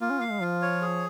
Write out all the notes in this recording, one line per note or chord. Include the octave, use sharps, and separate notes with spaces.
A#3 F4
C#4
A#3 F5
G#3
F3 F4
C#5
G#4